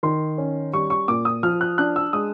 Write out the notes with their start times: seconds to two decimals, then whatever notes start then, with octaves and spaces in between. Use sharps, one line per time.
0.03 D#3 C6
0.38 C#4
0.73 G3 C#6
0.90 C#6
1.08 A#2 D6
1.25 D#6
1.43 F3 F6
1.61 F#6
1.78 D4 F#6
1.96 E6
2.13 G#3 D#6